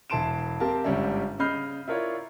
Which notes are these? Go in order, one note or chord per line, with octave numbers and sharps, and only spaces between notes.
E1 E3 A5 C6 D7 E7
C4 G4 A#4 F5 A5
G1 G#2 G3 C#4 D5 E5
C#3 D#5 B5 F6 G6 C7
E4 F4 A#4 C#5 D5